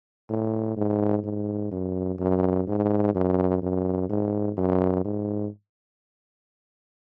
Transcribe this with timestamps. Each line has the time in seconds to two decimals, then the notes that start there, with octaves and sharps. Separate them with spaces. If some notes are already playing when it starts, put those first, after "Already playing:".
0.30 A2
0.77 G#2
1.24 G#2
1.71 F#2
2.19 F#2
2.67 G#2
3.15 F#2
3.62 F#2
4.10 G#2
4.57 F#2
5.05 G#2